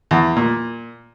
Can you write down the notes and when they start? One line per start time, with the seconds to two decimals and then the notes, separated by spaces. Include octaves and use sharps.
0.11 E2
0.36 A#2